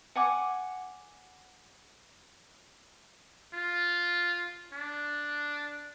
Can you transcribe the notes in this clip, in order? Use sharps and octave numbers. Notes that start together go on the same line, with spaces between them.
F#5 G#5 D6
F4
D4